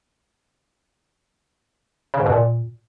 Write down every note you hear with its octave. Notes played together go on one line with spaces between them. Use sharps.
C#3
G#2
B2
A#2